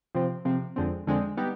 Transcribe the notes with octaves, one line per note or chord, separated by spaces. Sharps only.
C3 F3 C4
C3 F3 C4
F2 D3 G#3 C4
F2 D3 G#3 C4
G3 B3 D#4 G4